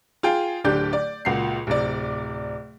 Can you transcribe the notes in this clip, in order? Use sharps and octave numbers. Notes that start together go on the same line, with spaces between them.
F4 G#4 G5
D1 D3 G4 D5 G6
D5
C#2 A#2 F#4 C7
D1 C3 D5